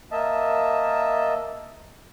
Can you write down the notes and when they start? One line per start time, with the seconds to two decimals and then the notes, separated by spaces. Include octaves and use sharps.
0.12 A#3 D#5 E5 A5